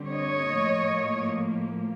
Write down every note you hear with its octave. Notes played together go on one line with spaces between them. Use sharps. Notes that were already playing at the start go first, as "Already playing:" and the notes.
Already playing: D3 G3 C4
C#5 D#5
A2 F3 A#3